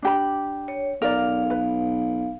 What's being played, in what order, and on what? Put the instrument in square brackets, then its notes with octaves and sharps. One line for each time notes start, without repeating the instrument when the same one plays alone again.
[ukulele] D4 G4 B5
[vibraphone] C#5
[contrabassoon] B1 [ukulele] A#4 D5 [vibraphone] F5
[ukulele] B4